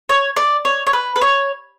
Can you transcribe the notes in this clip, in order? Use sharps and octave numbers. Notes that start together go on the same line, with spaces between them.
C#5
D5
C#5
C#5
B4
B4
C#5